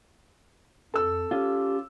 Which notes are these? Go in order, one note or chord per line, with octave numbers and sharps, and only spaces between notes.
F2 A4 E6
C#4 F4 G4